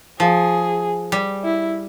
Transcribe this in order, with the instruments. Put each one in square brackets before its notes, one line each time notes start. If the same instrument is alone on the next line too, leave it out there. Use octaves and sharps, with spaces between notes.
[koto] F3 [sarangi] G#4
[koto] G3
[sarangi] E4